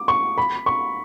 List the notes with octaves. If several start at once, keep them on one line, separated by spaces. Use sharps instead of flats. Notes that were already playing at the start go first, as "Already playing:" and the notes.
Already playing: D6
C#6
B5
C#6